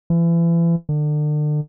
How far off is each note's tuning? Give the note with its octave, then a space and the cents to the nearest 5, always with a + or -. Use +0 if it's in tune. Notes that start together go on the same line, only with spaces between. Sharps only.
E3 +35
D3 +35